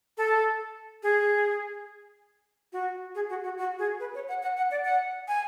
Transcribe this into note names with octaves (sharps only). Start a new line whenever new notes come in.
A4
G#4
F#4
G#4
F#4
F#4
F#4
G#4
B4
C#5
F#5
F#5
F#5
D5
F#5
G#5